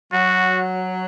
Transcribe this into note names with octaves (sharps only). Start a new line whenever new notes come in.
F#3 F#4